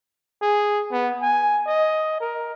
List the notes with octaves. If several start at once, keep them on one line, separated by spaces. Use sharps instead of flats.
G#4
B3
G#5
D#5
A#4